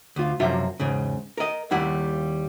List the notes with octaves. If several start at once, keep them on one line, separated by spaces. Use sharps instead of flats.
D2 F4
F#2 C3 F3 F4 F#4 E5
E2 G#2 C#3
A#4 D#5
D#2 G3 E4 F#5